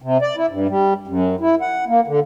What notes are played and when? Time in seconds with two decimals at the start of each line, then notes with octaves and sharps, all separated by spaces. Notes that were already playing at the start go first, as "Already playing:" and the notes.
0.02 C3
0.22 D5
0.37 E4
0.49 G2
0.69 G3
1.07 F#2
1.40 E4
1.61 F#5
1.88 A#3
2.07 D3